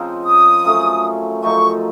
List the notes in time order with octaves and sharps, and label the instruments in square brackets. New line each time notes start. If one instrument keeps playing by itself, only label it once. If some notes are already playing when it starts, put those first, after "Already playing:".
Already playing: [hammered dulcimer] C#3 F3 C4 D#4
[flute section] D#6
[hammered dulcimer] F#2 F3 A3 C#4
[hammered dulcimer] F#2 F3 A3 D#4 [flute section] C#6